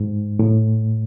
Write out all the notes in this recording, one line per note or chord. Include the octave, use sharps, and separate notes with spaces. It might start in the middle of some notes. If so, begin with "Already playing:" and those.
Already playing: G#2
A2